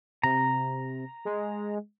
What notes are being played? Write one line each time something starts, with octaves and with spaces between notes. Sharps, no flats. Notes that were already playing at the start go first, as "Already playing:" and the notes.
C3 A#5
G#3